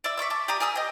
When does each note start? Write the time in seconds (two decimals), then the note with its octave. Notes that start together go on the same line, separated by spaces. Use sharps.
0.04 D5 E5 E6
0.17 E5 C#6 D6 E6
0.30 A5 D6
0.48 G4 D5 A#5 D#6
0.60 A#4 G#5 D#6 E6
0.76 D#5 G5